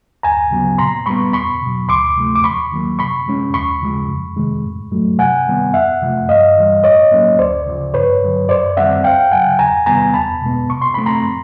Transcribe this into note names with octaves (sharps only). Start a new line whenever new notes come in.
D2 G#5 A#5
C#3 F#3 B3
A#2 A#5 C6
G3 B3 B5 C#6
E2 B5 C#6
B2 F#3
D2 C6 D6
C3 F3 A3
D6
D#2 B5 C#6
D#3 F#3 A#3
C3 B5 C#6
F3 G#3 C#4
D#2 B5 C#6
C#3 F3 G#3
F2
C3 D#3 G#3
A2
F#3 A3
C3 F#5 G#5
D#3 G3 B3
F2 E5 F#5
C3 F3 A3
G2 D#5 F5
E3 G3
A2 C#5 D#5
F#3 A#3 C#4
D2 C5 D5
C#3 F3
G2 B4 C#5
D3 F#3
F#2 C5 D5
D#3 G3 C4 E5 F#5
C#2 F5 G5
C#3 F#3 F#5 G#5
E2 G#5 A#5
C3 D#3 G3 B3 G#5 A#5
E2 A5 B5
B2 G#3 B3
C3 C#6
C6
F3 A3 C4 B5
A#5 C6
A2